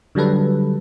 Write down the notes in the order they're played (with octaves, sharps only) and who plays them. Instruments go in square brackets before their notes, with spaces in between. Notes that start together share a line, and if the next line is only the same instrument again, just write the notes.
[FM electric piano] D3 F#3 G3 A4 B4